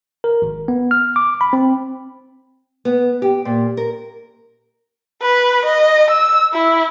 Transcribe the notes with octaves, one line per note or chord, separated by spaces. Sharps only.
A#4
G#1
B3
F6
D6
B5
C4
B3
G4
A#2
A#4
B4
D#5
E6
E4